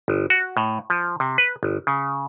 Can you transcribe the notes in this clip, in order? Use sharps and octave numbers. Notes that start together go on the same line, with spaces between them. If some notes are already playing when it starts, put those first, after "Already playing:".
G1
F#4
A2
F3
C3
B4
G1
C#3